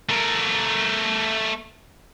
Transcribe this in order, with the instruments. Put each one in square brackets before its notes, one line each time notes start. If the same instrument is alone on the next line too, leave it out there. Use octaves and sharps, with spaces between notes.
[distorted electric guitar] A3 A#4